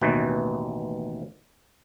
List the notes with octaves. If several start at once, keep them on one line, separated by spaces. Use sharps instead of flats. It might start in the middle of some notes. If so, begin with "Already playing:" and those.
A1 D#2 B2 E3